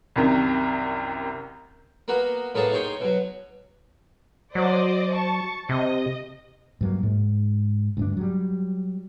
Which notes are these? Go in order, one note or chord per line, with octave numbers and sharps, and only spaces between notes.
C2 F#2 C3 D#3
A#3 B3 F#4
A2 A#3 B3 G#4 C#5 A5
D#4 G#4 C#5 G5 C6
B2 F#3
F#3 C5 D5 D#5
A5 C#6
C3 D#5
G2 F#3 A#3
G#2
D2 G2 D4
F#3 G3